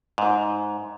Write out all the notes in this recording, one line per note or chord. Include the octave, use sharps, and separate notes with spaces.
G#2